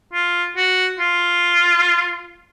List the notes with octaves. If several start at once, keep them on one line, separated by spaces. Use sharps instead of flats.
F4
F#4
F4